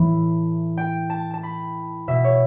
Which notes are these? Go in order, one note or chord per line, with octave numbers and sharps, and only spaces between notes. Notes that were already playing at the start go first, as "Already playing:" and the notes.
Already playing: A2 E3 B5
G5
A5
A5
B5
B2 E5
C#5